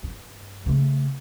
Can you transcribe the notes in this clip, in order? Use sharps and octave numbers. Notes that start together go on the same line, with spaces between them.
G2
C#3 A3